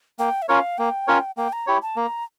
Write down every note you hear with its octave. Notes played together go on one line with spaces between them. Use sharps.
A#3 G5
E5
C#4 F4 A#4 C#5 F5
A#3 G5
C#4 F4 A#4 C#5
A#3 G5
A#5
E4 G4 C#5
A5
A#3 A#5